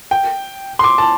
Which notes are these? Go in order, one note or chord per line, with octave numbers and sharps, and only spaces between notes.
G5
C6
D6
A5